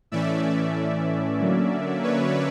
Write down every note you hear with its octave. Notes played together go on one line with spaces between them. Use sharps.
A2 E3 A3 C#4 D5 E5
D3 F#3 A#3 C#4
B4 C#5